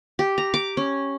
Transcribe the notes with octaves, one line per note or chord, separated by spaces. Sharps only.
G4
A#5
D6
C#4